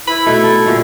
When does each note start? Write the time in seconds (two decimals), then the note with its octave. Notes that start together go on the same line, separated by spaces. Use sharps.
0.07 E4 B5
0.26 B2 A3 D#4
0.44 A4 G5
0.66 G2 A#2 D3